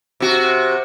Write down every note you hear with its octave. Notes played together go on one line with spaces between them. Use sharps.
C3 F#4